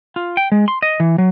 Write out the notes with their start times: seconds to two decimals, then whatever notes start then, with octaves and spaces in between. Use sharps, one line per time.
0.16 F4
0.37 G5
0.52 G#3
0.68 C6
0.82 D#5
1.00 E3
1.18 F#3